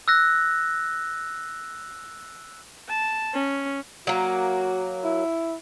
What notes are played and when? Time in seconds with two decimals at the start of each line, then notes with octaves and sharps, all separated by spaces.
0.08 E6 F#6 A#6
2.89 A5
3.34 C#4
4.07 F#3 A#3 F#4
5.04 E4